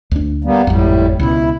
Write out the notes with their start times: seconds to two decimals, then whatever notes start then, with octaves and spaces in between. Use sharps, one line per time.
0.11 D2 D4
0.44 G3 A#3 B3
0.67 G#1 F2 A2 G3
1.20 C#2 B2 E4